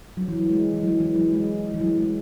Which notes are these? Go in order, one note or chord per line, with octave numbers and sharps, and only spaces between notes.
F#3
E3
F#3
G#3
E3
F#3
E3
F#3
G#3
E3
F#3
G#3